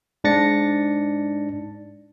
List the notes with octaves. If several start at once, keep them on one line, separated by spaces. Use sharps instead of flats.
G#2 D4 A6 A#6 C#7